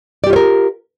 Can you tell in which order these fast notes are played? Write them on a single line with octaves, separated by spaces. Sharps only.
D5 G4 F4 C#5 A#4